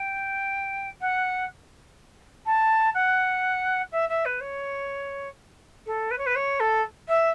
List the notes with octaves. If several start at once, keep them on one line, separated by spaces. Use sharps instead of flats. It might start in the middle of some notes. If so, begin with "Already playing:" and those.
Already playing: G5
F#5
A5
F#5
E5
E5
B4
C#5
A4
B4
C#5
B4
C#5
A4
E5